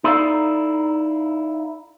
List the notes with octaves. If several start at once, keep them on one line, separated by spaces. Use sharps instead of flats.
D#4 E4 A4 D5 F5